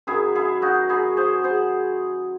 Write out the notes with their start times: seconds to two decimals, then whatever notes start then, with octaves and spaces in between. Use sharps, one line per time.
0.07 F#2 D#3 F#3 E4 G#4
0.35 E4 G#4
0.62 D#4 F#4
0.89 E4 G#4
1.17 G#4 C5
1.44 G#4 C5